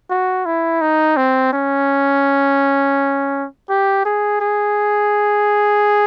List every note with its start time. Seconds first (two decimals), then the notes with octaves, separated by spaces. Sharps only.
0.10 F#4
0.46 E4
0.81 D#4
1.17 C4
1.53 C#4
3.69 G4
4.05 G#4
4.41 G#4